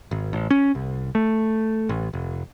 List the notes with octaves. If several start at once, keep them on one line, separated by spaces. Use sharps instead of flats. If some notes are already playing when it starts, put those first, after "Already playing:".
G#1
A1
C#4
C2
A3
A1
F1